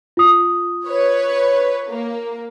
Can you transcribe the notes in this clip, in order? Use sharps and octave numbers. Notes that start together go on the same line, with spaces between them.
F4 D#6
B4 C#5
A#3